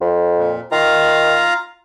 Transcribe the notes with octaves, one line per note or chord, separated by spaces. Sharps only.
F2
A#2
D#3 F4 F5 A#5